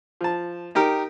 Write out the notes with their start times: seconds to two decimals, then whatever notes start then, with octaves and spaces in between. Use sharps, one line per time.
0.21 F3 A5
0.75 D#4 G4 A#4